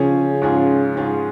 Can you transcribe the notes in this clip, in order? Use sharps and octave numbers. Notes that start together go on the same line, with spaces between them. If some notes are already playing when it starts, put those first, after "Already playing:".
Already playing: C#3 F3 C#4 G#4
G#2 F3 C#4 F4 G#4
G#2 F3 C#4 F4 G#4